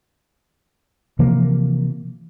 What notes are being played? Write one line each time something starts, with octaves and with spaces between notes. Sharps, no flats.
C3 E3 F3 A#3